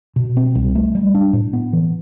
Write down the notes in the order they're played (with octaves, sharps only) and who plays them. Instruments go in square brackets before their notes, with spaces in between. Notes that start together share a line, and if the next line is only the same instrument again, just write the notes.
[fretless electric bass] B2
C4
C2
A3
G3
D4
A2
B3
E3